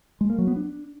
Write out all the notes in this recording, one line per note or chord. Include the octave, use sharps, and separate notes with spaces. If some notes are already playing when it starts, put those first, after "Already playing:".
G#3
A#3
F#3
B3
D4